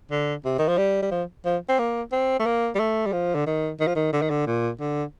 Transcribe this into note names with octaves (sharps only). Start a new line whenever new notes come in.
D3
C3
D#3
F3
G3
G3
F3
F3
C4
A#3
C4
A3
A#3
G3
A3
G3
F3
D3
D#3
D#3
F3
D#3
D3
D#3
D3
A#2
D3